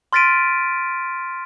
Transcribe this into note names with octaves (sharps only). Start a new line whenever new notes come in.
C6 F6 A6 B6 D7 D#7